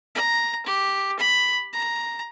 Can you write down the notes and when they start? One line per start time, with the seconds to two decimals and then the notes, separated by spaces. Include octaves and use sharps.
0.15 A#5
0.66 G4
1.19 B5
1.73 A#5